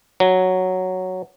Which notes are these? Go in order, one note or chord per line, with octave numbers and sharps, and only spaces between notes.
F#3